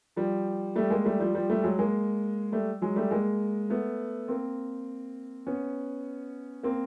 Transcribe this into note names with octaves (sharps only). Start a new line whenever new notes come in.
F3 G3
G3 A3
G#3 A#3
G3 A3
F3 G3
F3 G3
G3 A3
F#3 G#3
G#3 A#3
G3 A3
F#3 G#3
G3 A3
G#3 A#3
A3 B3
A#3 C4
B3 C#4
A#3 C4